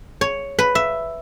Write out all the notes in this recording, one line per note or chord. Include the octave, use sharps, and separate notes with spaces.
C#5
B4
E5